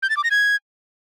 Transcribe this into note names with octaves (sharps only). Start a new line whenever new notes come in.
G6
A6
D6
A#6
G#6